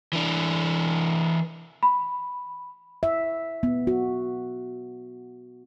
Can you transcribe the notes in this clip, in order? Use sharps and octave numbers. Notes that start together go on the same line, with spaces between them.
E3 D4
B5
E5
B3
F#4